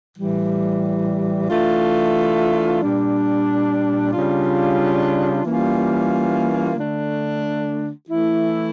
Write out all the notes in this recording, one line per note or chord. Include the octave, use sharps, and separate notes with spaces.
A2 E3 G3
E3 A3 D4 F4
A#2 G3 D4
C#3 G3 D4 F4
E3 G3 A#3 C#4 F4
D3 A3 D4
E3 A3 E4